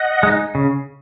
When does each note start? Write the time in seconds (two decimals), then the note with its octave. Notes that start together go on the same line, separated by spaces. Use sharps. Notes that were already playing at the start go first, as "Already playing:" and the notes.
Already playing: D#5 F#5
0.23 G#3 D#4
0.55 C#3